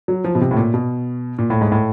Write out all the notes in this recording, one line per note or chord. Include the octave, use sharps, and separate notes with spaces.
F#3
F3
B2
C3
A2
A#2
B2
A#2
A2
G#2
A2